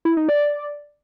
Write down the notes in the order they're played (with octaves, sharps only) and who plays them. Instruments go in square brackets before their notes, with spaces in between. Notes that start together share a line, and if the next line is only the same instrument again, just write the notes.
[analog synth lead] E4
D#4
D5